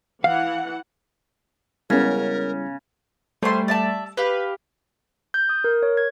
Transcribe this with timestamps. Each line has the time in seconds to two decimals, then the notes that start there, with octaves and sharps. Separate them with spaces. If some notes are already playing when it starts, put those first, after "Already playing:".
0.24 E3 F5 F#5
1.90 C#3 G3 G#3 B3 C#4 E4 A#4
3.42 G3 A3 C5 G#5 C6
3.68 D5 E5 A5
4.17 G4 B4 F5
5.34 G6
5.49 D#6
5.64 A#4
5.83 C#5
5.97 G#6